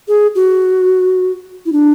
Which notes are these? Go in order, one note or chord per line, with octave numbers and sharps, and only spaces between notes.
G#4
F#4
E4
D4